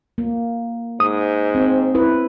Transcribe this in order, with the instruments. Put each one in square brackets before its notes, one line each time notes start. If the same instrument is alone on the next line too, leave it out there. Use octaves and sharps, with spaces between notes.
[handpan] A#3
[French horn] G#2 [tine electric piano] D#6
[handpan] C4
E4 B4